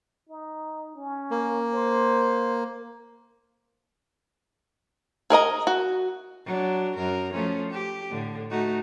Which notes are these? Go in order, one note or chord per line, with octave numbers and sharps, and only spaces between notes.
D#4
C#4
A#3
C5
G#4 A#4 D#5 A#5
F#4
F#3 D4
F#2 A#4
F3 A3 C#4
G4
A2 D3
A3 D#4 F#4